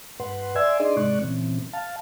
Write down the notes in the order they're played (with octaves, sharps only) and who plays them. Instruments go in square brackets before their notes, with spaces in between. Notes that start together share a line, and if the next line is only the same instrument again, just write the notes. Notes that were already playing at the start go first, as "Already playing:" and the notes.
[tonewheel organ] G2 B4 F#5 C6
D5 E5 G#5 C6 E6 G#6
D4 D#4 G#4 D5 D#5 C6
G#2 C3 G#3 D5 C#6 F#6
A#2 C#3 E3 C4
F5 A5